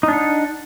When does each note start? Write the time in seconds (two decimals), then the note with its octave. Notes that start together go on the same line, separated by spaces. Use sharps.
0.03 D#4
0.08 D4
0.13 F#5